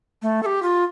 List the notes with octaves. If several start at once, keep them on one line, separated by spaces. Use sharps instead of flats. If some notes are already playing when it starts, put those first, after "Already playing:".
A3
A4
G4
F4